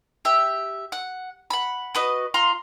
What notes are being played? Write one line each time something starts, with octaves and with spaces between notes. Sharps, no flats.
G4 E5
F#5
F#5 B5
F#4 B4 D#5
F4 A#5 C6